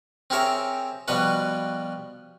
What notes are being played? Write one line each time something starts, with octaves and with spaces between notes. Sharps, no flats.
C4 G4 G#4 A#4 C#5 E5
B2 F3 G3 F#4 B4